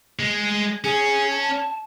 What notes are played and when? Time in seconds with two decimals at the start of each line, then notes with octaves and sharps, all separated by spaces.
0.19 G#3
0.84 C#4 G#4
1.31 A5